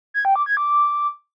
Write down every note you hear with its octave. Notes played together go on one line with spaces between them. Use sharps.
G#6
G5
D6
G#6
D6